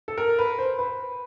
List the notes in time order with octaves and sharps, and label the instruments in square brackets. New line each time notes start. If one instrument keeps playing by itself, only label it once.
[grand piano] A4
A#4
B4
C5
B4